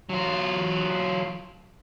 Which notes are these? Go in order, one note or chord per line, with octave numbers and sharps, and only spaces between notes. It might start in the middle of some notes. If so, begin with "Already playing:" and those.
F#3 F4